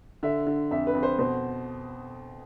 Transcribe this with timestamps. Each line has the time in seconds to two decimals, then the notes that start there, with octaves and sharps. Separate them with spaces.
0.23 D3 E5
0.47 D3
0.71 F2 E5
0.87 B4
0.95 F2
1.03 C5
1.18 B2 C5